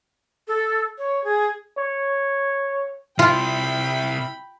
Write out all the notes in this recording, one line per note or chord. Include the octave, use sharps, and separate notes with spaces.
A4
C#5
G#4
C#5
C3 E4 F4 G5 B5